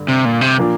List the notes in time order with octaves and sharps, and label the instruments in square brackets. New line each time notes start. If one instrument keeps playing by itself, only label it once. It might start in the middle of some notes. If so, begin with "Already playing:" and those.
Already playing: [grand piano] G2 D3
[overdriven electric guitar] C3
A#2
C3
[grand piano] A#2 F3 A#3 D4